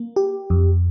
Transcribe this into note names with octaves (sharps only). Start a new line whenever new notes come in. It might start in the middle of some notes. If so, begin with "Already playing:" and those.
Already playing: A#3
G4
F2